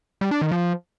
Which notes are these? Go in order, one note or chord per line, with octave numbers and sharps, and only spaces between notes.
G3
D4
D#3
F3